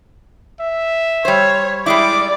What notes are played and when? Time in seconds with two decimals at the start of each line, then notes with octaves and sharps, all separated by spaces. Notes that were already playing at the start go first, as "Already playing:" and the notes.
0.60 E5
1.25 G3 C5 C#5
1.86 G3 G#3 E4 D5 D6